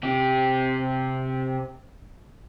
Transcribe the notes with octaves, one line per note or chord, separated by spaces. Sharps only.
C3 G4